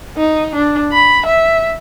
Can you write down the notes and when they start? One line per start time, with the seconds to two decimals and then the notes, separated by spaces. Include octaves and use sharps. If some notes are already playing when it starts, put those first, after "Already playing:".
0.17 D#4
0.55 D4
0.92 B5
1.26 E5